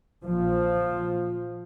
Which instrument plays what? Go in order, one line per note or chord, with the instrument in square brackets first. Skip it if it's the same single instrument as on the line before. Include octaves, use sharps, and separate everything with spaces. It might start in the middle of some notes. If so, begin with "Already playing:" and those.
[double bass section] A#1 A#2 F3